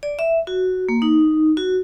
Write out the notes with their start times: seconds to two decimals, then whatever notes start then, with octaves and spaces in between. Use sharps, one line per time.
0.03 D5
0.19 E5
0.47 F#4
0.89 A#3
1.02 D#4
1.57 F#4